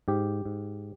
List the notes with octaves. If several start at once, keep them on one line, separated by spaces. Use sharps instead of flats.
G#2 G4
G#2